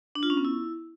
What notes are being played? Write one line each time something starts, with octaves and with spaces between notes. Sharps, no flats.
D4
F4
C#4
B3
E4